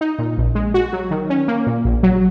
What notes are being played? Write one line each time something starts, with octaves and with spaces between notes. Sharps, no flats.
D#4
A#2
A#1
G#3
F#4
F#3
D#3
C#4
A#3
A#2
A#1
F#3